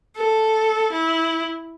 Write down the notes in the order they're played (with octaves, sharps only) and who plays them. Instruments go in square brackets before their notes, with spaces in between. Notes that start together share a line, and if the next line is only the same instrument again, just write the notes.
[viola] A4
E4